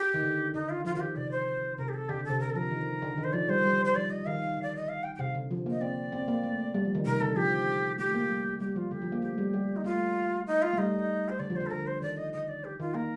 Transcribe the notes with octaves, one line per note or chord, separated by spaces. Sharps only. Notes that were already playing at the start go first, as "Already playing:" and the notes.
Already playing: G4
D#3
D3
D3 D#4
F4
F3 F4
D#3 F4
G4
D3
C3 D5
C5
C3 A#4
G4
A4
D3 G4
D3
C3 A4
D3 A#4
A4
F3 A#4
D#3
D3
D#3
C5
F3 D5
G3 C5
G3
C5
F3 D5
D#5
D#3 F5
D3
D5
D#5
F5
G5
G5
C3 F5
D3
F3
A#3
D#5
C4 D5
C4
A#3
A3
G3
F3
D#3
C3 A#4
D3 A4
F3 G4
A3 G4
A#3
G3
G3 G4
F3 F4
D3 G4
F3
A#3
A3 G4
G3
G3
D#4
A3 F4
D#4
F4
A3
G3 D#4
C5
D3 D5
F3
D3 C5
A4
D3 A#4
C5
D#3 D5
D#5
D3 D#5
D5
G4
D#3 F4
A#3 A#4